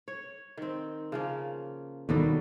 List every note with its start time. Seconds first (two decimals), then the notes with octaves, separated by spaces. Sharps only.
0.08 C#5
0.57 D#3 C4
1.12 C#3 F3 A#3
2.09 D#2 B2 D3 D#3 F#3 G3